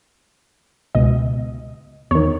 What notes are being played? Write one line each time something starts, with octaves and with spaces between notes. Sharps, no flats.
C#2 B2 D#5
E2 D#3 C#5